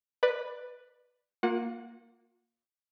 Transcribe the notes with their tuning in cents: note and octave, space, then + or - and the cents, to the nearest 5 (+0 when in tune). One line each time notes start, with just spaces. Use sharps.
B4 +0 D5 +20
A#3 +0 F4 +35 F#5 -20